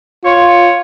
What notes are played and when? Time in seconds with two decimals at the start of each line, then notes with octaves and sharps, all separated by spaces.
0.24 F4 C#5